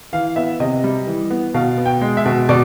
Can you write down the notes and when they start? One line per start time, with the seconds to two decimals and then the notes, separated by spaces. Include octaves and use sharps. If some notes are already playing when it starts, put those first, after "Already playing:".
0.13 E3 F5
0.36 B3 E5
0.60 C3 D#5
0.84 G3
1.07 E3
1.30 B3
1.54 B2 F5
1.78 B3
1.86 G5
2.01 G#3
2.17 E5
2.25 B2
2.49 B2 D5